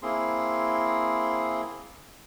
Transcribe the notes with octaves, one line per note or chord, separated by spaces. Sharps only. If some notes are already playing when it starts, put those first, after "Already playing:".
A#3 C4 E4 G#4 C6